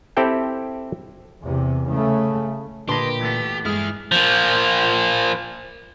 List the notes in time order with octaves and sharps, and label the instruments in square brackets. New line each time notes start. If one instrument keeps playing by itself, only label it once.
[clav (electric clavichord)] C4 E4 G4 A4 G5
[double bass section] E2 C3
C#3 A3
[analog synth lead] A#2 [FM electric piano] D3 B4 A5 [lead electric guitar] G4 [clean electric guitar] D#5 C6
[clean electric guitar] E3 A3 B3
[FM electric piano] G2 G#3 D#6 [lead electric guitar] E4 G#4 [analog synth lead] F6
[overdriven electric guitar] A#2 F3